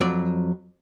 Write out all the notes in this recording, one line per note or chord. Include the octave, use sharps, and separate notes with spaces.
F2 F#3 D5